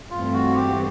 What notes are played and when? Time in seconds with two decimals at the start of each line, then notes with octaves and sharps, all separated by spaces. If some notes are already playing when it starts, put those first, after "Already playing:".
0.10 G2 E3 A3 C4 F4
0.34 F#4
0.55 G4